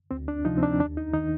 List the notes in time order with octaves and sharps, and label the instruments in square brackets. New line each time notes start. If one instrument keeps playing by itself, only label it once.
[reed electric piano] D2 C4
D4
C3 F3 D#4
C4
D4
D#2 D4
D#4
D#3 D#4